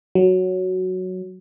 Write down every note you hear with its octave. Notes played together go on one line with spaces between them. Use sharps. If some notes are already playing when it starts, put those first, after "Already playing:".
F#3